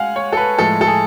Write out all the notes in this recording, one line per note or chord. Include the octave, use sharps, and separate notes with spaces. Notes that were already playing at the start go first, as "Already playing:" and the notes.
Already playing: G#3 F5 F#5 G#5
C#5
A4
B4
A2 F3 G#3 A4
A4
G#4